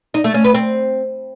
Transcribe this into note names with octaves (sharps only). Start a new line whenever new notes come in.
D#4
A3
C#4
B4
C4